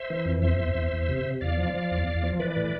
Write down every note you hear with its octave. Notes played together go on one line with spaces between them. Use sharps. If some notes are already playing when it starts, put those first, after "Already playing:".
Already playing: C5 E5
E3
F2
E2 C5 E5
E2
E2
E2
C3
C3
E2 D5 F5
F3
F3
E2
E2
F3
E3 B4 D5
A2